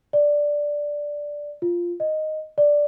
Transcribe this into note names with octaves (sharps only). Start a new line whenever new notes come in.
D5
F4
D#5
D5